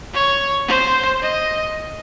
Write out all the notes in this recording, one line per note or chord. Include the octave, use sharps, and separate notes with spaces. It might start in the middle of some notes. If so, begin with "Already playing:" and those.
C#5
C5
D#5